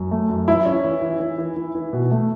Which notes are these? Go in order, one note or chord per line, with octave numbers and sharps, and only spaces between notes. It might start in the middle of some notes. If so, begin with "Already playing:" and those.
Already playing: F#2
A3
F#2
E3 E4
C#4
E3
E3
E3
E3
E3
E3
B2
A3